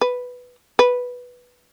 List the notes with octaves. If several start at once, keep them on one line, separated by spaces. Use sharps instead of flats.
B4
B4